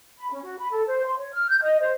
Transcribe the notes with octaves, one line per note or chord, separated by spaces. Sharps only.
B5
C#4
F#4
B5
A4
C5
C6
C#5
F6
G6
D#5
C5